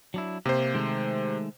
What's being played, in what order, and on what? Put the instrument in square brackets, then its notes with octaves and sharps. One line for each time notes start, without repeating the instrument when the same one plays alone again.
[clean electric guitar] F#3 D4 E4
[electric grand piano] C3 C5 [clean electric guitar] A#3
[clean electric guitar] D#3 G#3 A3